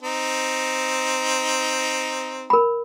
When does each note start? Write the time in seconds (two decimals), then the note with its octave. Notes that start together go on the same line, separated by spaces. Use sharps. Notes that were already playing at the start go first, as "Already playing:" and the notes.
0.02 C4 D#4
2.50 A#4 B5